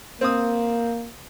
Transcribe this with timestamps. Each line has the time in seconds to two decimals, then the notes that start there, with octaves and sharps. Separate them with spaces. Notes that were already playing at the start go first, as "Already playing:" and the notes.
0.21 A#3 C4 D#6